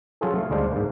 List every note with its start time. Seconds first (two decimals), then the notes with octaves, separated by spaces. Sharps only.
0.21 F#3 C#4 F4 G#4 A4
0.35 A3 F5
0.50 D2 G3 G#3 D4 C5 F5
0.72 G#2 A#3